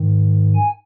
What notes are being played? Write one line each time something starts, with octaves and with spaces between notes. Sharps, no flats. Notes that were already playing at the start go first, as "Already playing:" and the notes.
Already playing: G#2 D#3
G#5